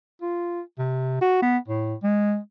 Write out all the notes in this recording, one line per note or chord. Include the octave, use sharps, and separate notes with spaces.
F4
C3
F#4
B3
A2
G#3